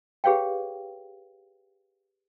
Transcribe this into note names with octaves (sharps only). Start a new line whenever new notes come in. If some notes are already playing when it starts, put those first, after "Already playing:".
G4 G#4 B4 C#5 F5 G5